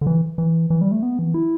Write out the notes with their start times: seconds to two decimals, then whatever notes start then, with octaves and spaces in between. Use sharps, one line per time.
0.01 D3
0.07 E3
0.38 E3
0.70 E3
0.81 G3
0.92 A3
1.03 B3
1.19 E3
1.34 E4